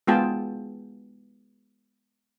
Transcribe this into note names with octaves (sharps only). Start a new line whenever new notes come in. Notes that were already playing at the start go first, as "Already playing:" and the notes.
G#3 B3 F4 G#4 G5 A5